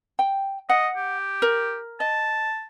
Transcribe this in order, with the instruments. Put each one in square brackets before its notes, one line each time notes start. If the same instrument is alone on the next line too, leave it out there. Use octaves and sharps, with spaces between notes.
[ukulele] G5
[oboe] D#5 [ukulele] F#5
[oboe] G4
[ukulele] A#4
[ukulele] D#5 [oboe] A5